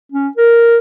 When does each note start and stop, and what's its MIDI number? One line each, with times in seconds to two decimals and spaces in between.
0.12 0.28 61
0.37 0.78 70